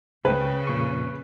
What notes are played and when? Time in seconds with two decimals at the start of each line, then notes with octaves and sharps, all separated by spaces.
0.25 C#2 C#3 B4 G5
0.67 F2 A#2 C#6